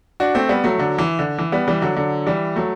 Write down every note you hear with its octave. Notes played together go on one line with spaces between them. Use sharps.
D4 F#4
A3 C4
G3 B3
F#3 A3
D3 F#3
E3
D3
E3
G3 B3
E3 G3
D3 F#3
D3 F#3
E3 G3
F#3 A3